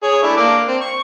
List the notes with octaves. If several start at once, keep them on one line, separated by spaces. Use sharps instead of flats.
G#4 C#5
A3 D4 E4
A#3 D4 D6
C4
C#6